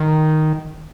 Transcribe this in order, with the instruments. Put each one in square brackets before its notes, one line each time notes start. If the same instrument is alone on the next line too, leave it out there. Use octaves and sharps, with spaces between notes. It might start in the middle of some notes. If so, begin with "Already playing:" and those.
Already playing: [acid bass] D#3